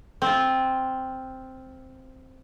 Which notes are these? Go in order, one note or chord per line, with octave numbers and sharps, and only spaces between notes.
C4 F4